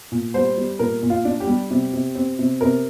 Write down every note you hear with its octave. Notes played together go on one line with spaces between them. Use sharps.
A#2
G3 C5
G3
A#2 A#4
A#2
F4
D4
G4
G3
C3
C3
C4
C3
C3 A#4